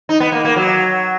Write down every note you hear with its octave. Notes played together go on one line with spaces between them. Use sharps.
D#4
B3
A#3
A#3
F#3